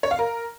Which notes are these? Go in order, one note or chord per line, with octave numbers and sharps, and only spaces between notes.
C#5
F5
A#4